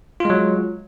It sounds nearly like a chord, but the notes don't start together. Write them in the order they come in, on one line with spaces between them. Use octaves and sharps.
F4 G#3 F#3